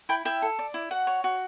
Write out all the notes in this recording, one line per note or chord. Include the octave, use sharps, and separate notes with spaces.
E4 G5 B5
E4 E5 G5
A4
D5
E4
F#4 F#5
C#5
F#4